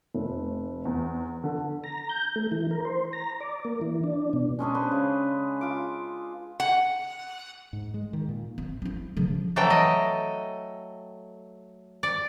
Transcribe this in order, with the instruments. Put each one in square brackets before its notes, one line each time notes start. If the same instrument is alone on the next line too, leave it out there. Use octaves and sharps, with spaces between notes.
[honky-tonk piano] F1
E2
D3
[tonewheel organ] A#5
G6
A3
E3
A#4
C5
A#5
D5
A#3
E3
D4
B2
[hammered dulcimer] G#3 C#4 D4 G#4
B4 C5
C#3
F4 D6
[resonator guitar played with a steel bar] F#5
[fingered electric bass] G#2
G#3
D#3
A#2
[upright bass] C4
F3 E4
C#3 F3
[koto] E3 F#3 A3 A4 G5
D#5
D5